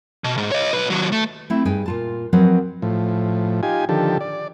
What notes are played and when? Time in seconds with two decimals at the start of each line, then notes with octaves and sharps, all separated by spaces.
0.24 B2
0.37 G#2
0.52 C#5 D#5
0.73 B1 B4
0.90 D#2 F#3
1.12 A3
1.50 A3 C4 E4
1.65 G2 D#4 G#4 G5 G#5
1.86 A#2 F4 A5
2.33 F3 F#3 C4 A#4 B4 D#5
2.82 A2 F3
3.63 D#4 F4 G4 G#5
3.89 D3 D#3 F3 G4 A4
4.21 D5